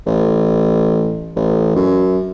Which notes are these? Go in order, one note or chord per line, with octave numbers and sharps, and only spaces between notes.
A1
A1
F#2